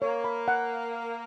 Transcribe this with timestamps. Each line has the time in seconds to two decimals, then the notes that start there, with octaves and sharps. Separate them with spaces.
0.01 A#3 C#5
0.24 B5
0.48 F#5